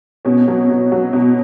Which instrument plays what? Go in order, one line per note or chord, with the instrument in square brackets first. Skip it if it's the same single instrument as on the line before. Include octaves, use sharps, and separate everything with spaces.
[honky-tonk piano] B2 C#4
F#3
B2
F#3
B2